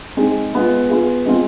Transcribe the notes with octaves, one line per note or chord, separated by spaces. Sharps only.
G#3 C4 D#4 G#4
G#3 B3 F4
B3 F4 G#4
G#3 C4 F4